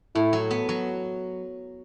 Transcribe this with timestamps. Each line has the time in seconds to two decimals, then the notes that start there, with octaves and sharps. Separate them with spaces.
0.15 A2 E4
0.33 F#3
0.51 B3
0.69 F#3